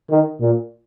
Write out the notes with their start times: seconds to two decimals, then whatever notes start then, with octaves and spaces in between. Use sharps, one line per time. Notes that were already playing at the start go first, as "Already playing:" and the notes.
0.10 D#3
0.41 A#2